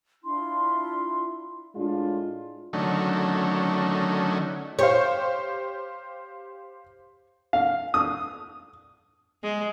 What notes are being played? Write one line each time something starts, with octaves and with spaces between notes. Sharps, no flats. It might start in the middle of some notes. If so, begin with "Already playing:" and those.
D4 E4 F4 C6
A2 G#3 D4 F4
D3 D#3 F#3 A3 C#4
G4 C5 C#5 F5
F5
D#6
G#3